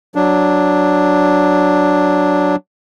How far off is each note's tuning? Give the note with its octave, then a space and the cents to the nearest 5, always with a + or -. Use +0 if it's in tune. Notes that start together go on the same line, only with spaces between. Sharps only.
F#3 +0 D4 +0